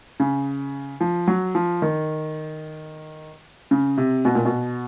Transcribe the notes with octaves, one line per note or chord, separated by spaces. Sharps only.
C#3
F3
F#3
F3
D#3
C#3
C3
B2
A#2
B2